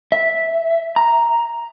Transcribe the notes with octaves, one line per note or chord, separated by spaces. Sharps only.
E5
A#5